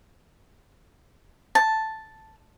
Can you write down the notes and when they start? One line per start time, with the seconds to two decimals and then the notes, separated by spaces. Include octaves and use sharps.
1.55 A5